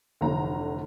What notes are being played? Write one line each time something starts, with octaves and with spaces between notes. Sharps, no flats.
F1 D2 D3 E3 A3 A#5